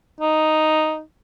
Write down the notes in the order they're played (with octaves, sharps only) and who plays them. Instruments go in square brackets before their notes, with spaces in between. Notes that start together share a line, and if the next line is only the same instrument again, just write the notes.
[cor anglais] D#4